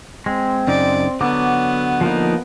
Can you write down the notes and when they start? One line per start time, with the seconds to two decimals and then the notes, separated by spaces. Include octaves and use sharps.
0.26 G#3 C4
0.67 F#2 C#3 D#4 D5
1.21 D3 F#3 B3 D6
2.01 F3 A#3 D#4